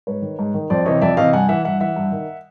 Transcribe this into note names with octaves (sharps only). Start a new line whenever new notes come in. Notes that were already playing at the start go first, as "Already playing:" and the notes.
G#2 B4 C#5
D#3
G#2
D#3
F2 C5 D5
C3 E3 C#5 D#5
F2 D5 E5
C3 E3 D#5 F5
G2 F#5 G#5
E3 E5 F#5
G2 E5 F#5
E3 E5 F#5
G2
D#3